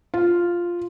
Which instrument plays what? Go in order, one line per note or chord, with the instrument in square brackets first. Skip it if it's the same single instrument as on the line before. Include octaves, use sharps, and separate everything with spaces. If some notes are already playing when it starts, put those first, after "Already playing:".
[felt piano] F4